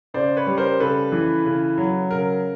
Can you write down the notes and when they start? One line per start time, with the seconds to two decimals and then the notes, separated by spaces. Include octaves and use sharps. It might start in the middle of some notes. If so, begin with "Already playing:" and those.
0.14 C#3 C5 D5
0.37 B4 C#5
0.47 G3
0.57 A#4 C5
0.80 C#3 A4 B4
1.12 E3
1.45 C#3
1.78 F#3
2.11 C#3 A#4